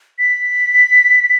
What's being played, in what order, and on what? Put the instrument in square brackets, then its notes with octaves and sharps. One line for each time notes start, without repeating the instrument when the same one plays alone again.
[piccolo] B6